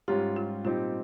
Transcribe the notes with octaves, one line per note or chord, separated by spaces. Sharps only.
G#2 G3 C#4 F4 G4
F4
A#2 G3 C4 D#4 F4 G4